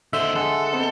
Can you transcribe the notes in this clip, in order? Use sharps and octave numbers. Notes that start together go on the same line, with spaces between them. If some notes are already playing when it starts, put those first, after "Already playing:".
D#2 D3 C5 D#5 E5
G#3 A4 F#5
B3 C4 D#5